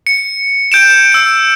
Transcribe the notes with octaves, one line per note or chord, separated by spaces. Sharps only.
C#7
G6 D7 E7
E6 D7